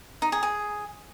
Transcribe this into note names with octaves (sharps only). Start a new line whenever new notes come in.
D#4
G#4
G#4